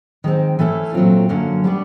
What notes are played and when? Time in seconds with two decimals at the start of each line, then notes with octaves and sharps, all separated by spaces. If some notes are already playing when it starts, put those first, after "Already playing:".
0.24 D#3 G#3 C4
0.59 E3 A3 C#4 E4 A4
0.94 A#2 F#3 A3 C4 F4
1.29 F#2 D3 F#3 A#3 C#4
1.64 G3 B3 D4 G4